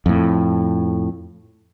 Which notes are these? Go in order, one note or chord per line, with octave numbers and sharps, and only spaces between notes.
F2 A2